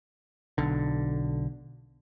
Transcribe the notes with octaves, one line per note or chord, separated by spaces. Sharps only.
B1 D3